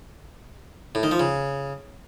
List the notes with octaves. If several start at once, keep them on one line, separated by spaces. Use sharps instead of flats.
A2
D#3
F3
C#3